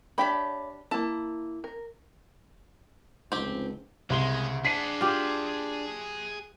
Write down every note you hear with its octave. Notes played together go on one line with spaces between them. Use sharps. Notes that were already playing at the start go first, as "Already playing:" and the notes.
D4 G4 C#5 E5 G5 B5
A#3 E4 A5
A#4
F1 C#2 C4 G4
C2 C#3 G#3 G#4 C6 G7
D4 G#4 F#5 B6 C7 D#7
F4 G4